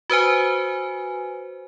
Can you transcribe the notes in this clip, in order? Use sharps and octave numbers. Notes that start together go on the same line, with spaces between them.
F#4 B4 C5 G#5